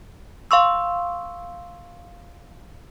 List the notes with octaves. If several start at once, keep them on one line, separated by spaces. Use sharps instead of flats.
F5 C6 C#6 E6